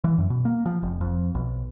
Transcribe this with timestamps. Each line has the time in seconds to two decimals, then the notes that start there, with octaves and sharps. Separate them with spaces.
0.04 E3
0.18 F#2
0.30 B2
0.45 A#3
0.66 F3
0.83 F1
1.01 F2
1.35 B1